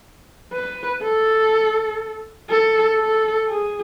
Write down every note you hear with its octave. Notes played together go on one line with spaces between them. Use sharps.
B4
A4
A4
A4
G#4